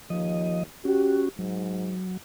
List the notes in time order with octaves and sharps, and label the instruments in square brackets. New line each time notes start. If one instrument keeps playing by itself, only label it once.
[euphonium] D#2 [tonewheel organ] F3 D#5
[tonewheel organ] C#4 F#4 [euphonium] G4
[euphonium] G#2 [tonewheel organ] F#3